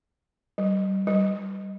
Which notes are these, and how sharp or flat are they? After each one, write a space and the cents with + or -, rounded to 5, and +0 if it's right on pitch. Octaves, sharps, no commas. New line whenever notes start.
G3 -30
G3 -20